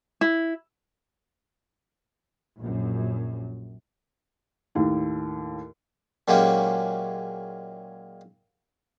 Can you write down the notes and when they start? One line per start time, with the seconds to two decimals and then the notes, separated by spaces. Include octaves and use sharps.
0.21 E4
2.60 A#1 F#2
4.75 D#2 A2
6.28 A#2 F#3 G#3 A#3 C#4 G4